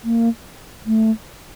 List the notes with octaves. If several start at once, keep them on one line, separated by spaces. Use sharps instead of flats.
A#3
A3